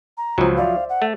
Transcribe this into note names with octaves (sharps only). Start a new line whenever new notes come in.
A#5
C#2 F3 F#3
C5 D5 E5 F5
F#5
A3